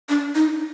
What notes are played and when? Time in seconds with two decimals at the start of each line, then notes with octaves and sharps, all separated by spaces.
0.09 D4
0.35 D#4